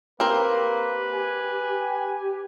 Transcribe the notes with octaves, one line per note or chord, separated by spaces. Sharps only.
A#3 C4 G4 A#4 B4
G#5